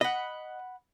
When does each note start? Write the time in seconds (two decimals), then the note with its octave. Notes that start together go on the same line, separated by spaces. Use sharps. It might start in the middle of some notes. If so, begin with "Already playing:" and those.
0.01 D#5 F#5 B5